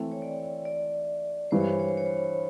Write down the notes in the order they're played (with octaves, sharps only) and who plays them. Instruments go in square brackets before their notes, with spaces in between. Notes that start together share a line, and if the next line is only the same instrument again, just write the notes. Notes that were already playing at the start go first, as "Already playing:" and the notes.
Already playing: [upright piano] E3 A3 C4 [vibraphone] G5
[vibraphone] C#5
D5
D5
[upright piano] G2 E3 G3 [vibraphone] C5
[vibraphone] C#5
C5
C#5
C5
C#5
C5